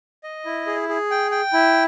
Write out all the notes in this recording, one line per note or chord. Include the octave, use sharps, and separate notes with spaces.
D#5
E4
G#4
G#4
G5
G5
E4